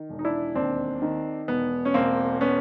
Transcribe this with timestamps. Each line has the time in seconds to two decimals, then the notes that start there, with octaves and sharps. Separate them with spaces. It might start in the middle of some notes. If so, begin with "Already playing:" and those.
Already playing: D#3
0.09 E1
0.19 D#4
0.25 D4 E4
0.55 D#2 C4 D4
1.02 D#3
1.48 E1 B3
1.85 C#4
1.94 E1 A#3 C4
2.41 B3 C#4